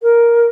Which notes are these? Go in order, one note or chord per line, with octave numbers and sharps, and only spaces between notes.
A#4